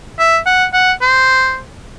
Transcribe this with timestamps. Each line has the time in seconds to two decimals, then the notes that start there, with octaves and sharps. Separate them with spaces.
0.19 E5
0.46 F#5
0.73 F#5
1.01 C5